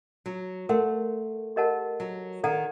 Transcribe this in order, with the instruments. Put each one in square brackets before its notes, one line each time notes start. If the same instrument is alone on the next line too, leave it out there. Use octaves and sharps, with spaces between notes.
[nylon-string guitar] F#3
[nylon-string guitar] A3 [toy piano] A#4 F#5 C6
[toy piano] G4 A#4 D#5 F#5 A5
[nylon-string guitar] F#3
[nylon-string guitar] D#3 [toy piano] A4 D5 F#5 A#5